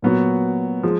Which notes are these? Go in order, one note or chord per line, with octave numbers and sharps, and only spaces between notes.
A#2 F#3 B3 F#4
F3 G#3